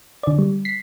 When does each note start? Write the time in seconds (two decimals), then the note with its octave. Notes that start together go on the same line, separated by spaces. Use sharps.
0.23 D3 D5
0.38 G3
0.65 B6 C7